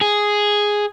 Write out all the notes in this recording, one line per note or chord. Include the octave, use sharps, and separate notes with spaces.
G#4